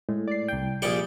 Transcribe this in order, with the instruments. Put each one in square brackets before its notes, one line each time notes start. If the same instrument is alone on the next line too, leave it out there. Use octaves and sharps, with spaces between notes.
[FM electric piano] A2 [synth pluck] G#3
[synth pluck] D5 C7
[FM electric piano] C2 G5
[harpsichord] A#1 G3 G5 [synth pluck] G4 G#4 [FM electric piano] C#7